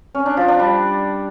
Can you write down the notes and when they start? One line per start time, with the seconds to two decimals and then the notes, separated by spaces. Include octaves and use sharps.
0.15 C#4
0.26 D4
0.37 F3
0.48 D4
0.59 G3